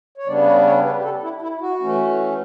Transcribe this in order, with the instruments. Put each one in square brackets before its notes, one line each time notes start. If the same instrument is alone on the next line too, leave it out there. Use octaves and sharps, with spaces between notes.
[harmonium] C#5
C#3 G3 B3 D4 D5
B4
C#5
C#5
B4
G4
A4
E4
E4
F#4
E3 A3 C#4